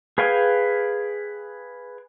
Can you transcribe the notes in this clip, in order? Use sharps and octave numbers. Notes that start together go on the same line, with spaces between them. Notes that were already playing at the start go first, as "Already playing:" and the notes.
G#4 B4 F5 G5 G#5